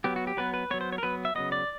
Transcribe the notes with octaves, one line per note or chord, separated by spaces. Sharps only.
F#3 B3 G4
F#4
G4
F#3 B3 B4
B4
F#3 B3 C#5
C5
C#5
A#4
F#3 B3 B4
E5
C#3 F#3 B3 D#5
D5